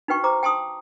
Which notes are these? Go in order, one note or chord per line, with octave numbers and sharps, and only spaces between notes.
D#4 F#4 B4 G5 C#6
C5 A#5 D6
G5 A5 C6 D#6